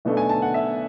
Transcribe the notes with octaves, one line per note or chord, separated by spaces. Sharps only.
B1 B2 A3 D4
G#5
A5
F#5
E5